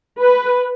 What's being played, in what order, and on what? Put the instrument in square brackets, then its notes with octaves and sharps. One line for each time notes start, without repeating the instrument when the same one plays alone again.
[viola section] B4